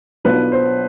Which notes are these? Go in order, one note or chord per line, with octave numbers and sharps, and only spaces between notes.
B1 B2 B3 D4 F4 B4
C5